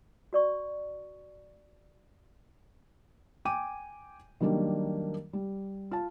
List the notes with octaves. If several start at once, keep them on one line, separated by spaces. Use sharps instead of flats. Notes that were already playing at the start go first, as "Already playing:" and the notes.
F#4 D5 C#6
G5 G#5 D6 D#7
D#3 F#3 G3 A#3 D4
G3
F4 A5